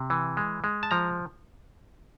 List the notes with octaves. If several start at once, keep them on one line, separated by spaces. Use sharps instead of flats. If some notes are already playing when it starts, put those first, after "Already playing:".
Already playing: C3
E3
G#3
G#3
A5
F3 A#5